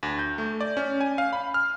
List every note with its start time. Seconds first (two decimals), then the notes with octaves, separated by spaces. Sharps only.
0.03 D2
0.19 G6
0.38 A3
0.61 D5
0.77 C#4
1.01 G#5
1.18 F5
1.33 B5
1.54 F6